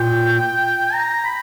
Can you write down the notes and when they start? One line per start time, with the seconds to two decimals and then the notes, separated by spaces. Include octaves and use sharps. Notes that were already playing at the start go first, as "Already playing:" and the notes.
Already playing: A#2 G5
0.94 A#5
1.24 B5